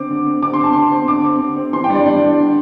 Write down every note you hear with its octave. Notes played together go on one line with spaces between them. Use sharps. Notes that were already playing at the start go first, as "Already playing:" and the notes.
Already playing: D3 C4 D6
D3
C4
D3 D6
C6
C4 A5
D3 C6
C4
D3 D6
C4
D3
C4
E3 C6
G5
G3 D4
D5
E3 D5
G3 D4
D3